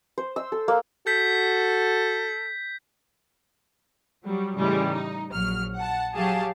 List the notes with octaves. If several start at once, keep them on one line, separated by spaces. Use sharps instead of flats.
C5
E6
A4
A#3
F#4 A4 G6 B6
F#3 G3
A2 C#3 E3 G3 G#3
D#4
A#1 F#3 F6
F#5 A5
F#3 G4 G#4 F5 A5